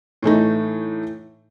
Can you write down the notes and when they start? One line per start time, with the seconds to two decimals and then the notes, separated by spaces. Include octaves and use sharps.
0.23 A2 E3 A3 D#4